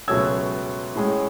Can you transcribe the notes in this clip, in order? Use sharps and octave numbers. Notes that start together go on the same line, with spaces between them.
C#2 B2 F#3 A3 C#4 E6 G#6
A2 G#3 C#4